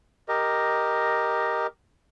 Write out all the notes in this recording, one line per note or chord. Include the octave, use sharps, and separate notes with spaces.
G4 A#4 D#5